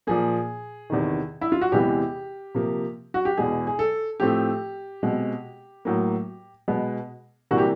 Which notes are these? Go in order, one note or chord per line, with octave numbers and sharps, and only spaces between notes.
A#2 F3 A#3 G#4
E2 C3 D#3
E4
F4
F#4
E2 C3 E3 G#3 B3 G4
C3 F3 A#3
F#4
G4
E2 B2 G#3 G#4
G#4
A4
A2 F3 A3 C4 G4
B2 G#3 C4
A2 F#3 A#3
B2 G#3 B3
C3 E3 G3 A#3 F#4
G4